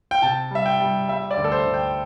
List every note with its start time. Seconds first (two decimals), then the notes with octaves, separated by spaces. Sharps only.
0.11 G5
0.22 C3 A5
0.51 G3 E5
0.66 G5
0.80 G3
1.09 G3 E5
1.31 D5
1.37 D2
1.44 A4
1.52 C5
1.66 D2
1.74 G5